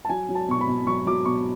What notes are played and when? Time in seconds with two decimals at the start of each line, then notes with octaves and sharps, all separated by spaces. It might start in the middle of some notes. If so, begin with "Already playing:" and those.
0.05 A5
0.09 F#3 G#5
0.29 F#3
0.35 A5
0.48 B2 C#6
0.61 B5
0.68 B2
0.87 F#3 C#6
1.06 F#3 D6
1.25 B2 C#6